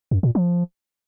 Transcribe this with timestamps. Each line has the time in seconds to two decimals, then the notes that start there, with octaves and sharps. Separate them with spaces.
0.11 F#2
0.23 A#2
0.35 F3